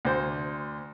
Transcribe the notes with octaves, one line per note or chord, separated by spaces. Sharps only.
D2 C5